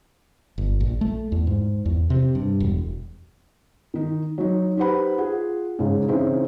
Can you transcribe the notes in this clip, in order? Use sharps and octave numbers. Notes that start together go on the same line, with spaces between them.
G1
A#1
A3
E2
G#2
E2
C3
G2
E1
D#3 D#4
F#3 D#4
D#4 G4 B4 C5 F#5 B5
F4 G#4 F#5
G#2 C#3
C#3 E3 C4 D#4 E4 C5